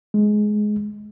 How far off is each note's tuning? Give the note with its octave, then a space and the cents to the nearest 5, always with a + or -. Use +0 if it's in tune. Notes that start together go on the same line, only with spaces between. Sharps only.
G#3 +15